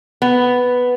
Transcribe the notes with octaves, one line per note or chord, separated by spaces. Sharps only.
B3